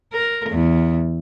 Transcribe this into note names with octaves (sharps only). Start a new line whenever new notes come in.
A#4
E2